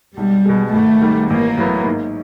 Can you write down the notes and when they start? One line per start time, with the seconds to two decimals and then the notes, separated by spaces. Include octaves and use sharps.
0.17 B1 G3
0.46 B2 G#3
0.73 G#1 A3
1.01 G#2 D#3 G3
1.30 A1 A#3
1.57 A2 F#3 B3
1.86 G#2